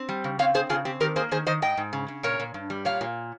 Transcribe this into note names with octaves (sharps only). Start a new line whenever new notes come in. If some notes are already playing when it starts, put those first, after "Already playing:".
Already playing: C4
G3
C#3
C4 C#5 F5
C4 G#4 C5
C#3 F4 G#4
C4 G4
D#3 G4 A#4
A#3 G#4 C5
D#3 G#4 C5
D#3 C5 D#5
G#2 D#5 G5
G#2
C#3
C#3
A#2 A#4 C#5
A#2
G2
G3
A#2 C#5 F5
A#2